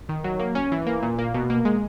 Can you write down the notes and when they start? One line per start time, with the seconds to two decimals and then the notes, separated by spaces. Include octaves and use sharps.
0.09 D#3
0.24 F#3
0.39 A#3
0.55 C#4
0.72 E3
0.87 A#3
1.02 A#2
1.19 A#3
1.34 B2
1.50 A#3
1.65 G#3